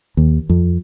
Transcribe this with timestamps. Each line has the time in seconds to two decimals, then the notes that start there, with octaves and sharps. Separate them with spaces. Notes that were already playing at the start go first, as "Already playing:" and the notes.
0.17 D#2
0.49 F2